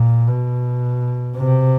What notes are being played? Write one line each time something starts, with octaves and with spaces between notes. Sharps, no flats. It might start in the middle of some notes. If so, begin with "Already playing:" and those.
Already playing: A#2
B2
C3